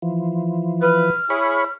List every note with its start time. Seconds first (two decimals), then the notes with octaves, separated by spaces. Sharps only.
0.02 E3 F3
0.82 B4 F6
1.30 E4 G#4 C#5 B5